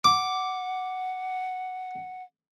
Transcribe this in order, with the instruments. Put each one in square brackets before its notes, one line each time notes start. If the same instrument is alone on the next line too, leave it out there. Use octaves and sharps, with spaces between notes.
[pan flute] F#5 [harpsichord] D6